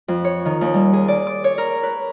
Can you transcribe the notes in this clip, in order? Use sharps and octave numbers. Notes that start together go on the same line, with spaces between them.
F2
C#5
D#3
D#2
G3
G#4
D5
D6
C#5
A#4
B4